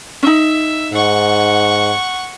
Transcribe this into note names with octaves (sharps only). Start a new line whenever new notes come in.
C#4 D#4 E5
G#2 F#5 C#6